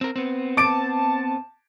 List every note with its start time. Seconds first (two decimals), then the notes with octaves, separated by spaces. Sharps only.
0.01 C4 A#4
0.16 B3 C4
0.57 A5 D6 D7